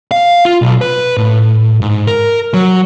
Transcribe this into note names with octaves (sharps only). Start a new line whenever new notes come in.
F5
F4
B1
B4
A2
G#2
A#4
F#3